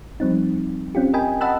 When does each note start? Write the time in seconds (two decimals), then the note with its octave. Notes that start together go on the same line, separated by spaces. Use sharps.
0.20 F3 G3 C4 D#4
0.95 C4 C#4 F4 G4
1.14 A#4 D#5 G5 G#5 B5
1.41 D#5 F#5 A5 B5 E6 F#6